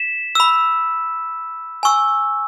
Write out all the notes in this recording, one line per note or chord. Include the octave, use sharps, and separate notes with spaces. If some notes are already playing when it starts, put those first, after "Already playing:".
Already playing: B6 E7
B5 E6
G#5 C#6 E6